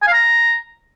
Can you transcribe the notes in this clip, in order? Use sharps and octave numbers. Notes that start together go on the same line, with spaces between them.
G#5
F5
A#5